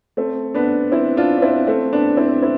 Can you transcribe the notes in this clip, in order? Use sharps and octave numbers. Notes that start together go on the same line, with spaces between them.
A3 C4
B3 D4
C4 E4
D4 F4
D4
C4 E4
A3 C4
B3 D4
C4 E4
C4 E4